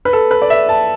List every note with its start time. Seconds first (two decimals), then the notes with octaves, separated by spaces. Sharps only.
0.05 B4
0.13 A4
0.31 B4
0.42 D5
0.50 E5
0.69 A5